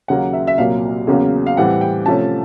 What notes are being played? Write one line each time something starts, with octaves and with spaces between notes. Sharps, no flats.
D#2 C#3 F#3 A#3 F#5
E5
E5
C2 A#2 F#3 A#3 F5
E2 C#3 F#3 A#3 C#4
F5
A2 E3 G3 C4 F#5
G5
C3 F3 A3 C#4 A5